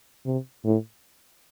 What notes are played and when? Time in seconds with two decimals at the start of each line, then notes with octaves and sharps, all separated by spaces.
0.26 C3
0.64 A2